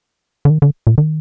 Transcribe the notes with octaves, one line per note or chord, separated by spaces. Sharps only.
D3
D#3
D3
A#2
D#3